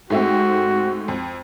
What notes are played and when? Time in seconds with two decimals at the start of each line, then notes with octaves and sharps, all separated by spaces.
0.10 G#2 A3 C4 F#4
1.08 F2